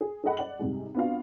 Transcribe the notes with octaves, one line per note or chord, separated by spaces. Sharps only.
G#4
G#4 A4 D#5 F#5 B5
D5 F#5 F#7
G#2 C3 G3 G#3
B3 C4 D4 F4 F#4 F5